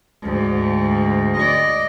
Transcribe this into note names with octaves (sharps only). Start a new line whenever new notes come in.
D2 G#2
D5 D#5